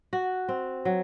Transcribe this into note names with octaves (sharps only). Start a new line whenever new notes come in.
F#4
C4
F#3